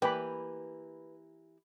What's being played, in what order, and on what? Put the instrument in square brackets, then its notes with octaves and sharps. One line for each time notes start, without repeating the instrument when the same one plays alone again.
[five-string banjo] E3 A#3 G4 [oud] B4 [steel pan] G5 B5